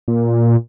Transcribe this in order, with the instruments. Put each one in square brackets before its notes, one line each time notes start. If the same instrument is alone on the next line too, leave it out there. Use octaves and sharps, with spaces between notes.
[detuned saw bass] A#2